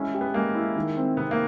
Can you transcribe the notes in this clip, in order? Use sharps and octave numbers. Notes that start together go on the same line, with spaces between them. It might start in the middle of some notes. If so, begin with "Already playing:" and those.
Already playing: G#3 C#4 E4
G4
B3
G#3 A#3
E4
D#3
C4
C3 B3
A#3